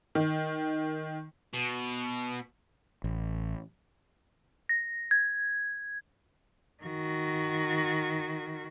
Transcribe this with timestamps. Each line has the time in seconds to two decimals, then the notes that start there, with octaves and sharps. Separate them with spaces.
0.15 D#3
1.54 B2
3.04 A1
4.69 A#6
5.11 G#6
6.83 D#3 F#4